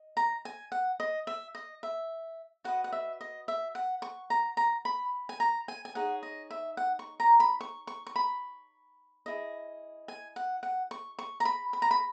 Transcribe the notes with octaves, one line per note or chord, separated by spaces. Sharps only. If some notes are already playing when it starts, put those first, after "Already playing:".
Already playing: D#5
A#5
G#5
F#5
D#5
E5
D#5
E5
F#4 B4 D#5 F#5
F#5
E5
D#5
E5
F#5
C#6
A#5
A#5
B5
G#5
A#5
G#5
G#5
D#4 G#4 C#5 F#5
D#5
E5
F#5
C#6
A#5
B5
C#6
C#6
C#6
B5
E4 G#4 D#5
G#5
F#5
F#5
C#6
C#6
A#5
B5
B5
A#5
B5